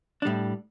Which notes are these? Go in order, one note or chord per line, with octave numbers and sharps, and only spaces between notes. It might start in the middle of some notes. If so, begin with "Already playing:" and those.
A2 G3 D4